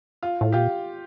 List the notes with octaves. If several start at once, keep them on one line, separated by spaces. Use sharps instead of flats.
F4
A2
A#2 F4 G4